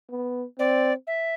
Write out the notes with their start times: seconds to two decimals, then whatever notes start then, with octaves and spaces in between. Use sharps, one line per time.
0.10 B3
0.59 C4 D5
1.07 E5